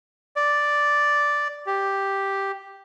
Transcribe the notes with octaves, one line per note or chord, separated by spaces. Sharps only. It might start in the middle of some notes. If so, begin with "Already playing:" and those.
D5
G4